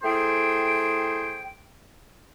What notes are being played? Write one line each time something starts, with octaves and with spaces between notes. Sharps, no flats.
A3 E4 G#4 C5 G5